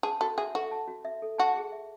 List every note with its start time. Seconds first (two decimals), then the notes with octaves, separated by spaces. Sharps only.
0.03 G#4 A5
0.21 F#4 A4
0.38 G#4 E5
0.54 F#4 A4
0.71 A5
0.88 F#4
1.05 E5
1.22 A4
1.38 F#4 A5
1.56 G#4
1.72 E5